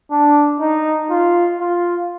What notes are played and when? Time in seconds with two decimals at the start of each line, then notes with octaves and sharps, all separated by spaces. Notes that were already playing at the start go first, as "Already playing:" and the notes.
0.11 D4
0.60 D#4
1.10 F4
1.60 F4